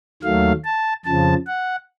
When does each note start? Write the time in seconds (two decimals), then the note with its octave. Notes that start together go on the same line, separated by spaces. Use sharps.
0.23 D#2 D#3 F#3 A3 F5
0.65 A5
1.05 F2 C#3 F3 A5
1.47 F#5